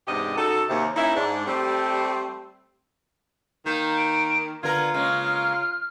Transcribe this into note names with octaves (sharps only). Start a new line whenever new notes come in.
E2 G#2 C3 D4 G4 D#5
C#3 D#4 F#4 A4
D#2 C3
A#3 C#4 D#4 E4
G#2 D4
G3 A3 C4
D#3 A#3 G6
D7
D3 B3 F4 A#4 G#6
C#3 G#3 A#3 F6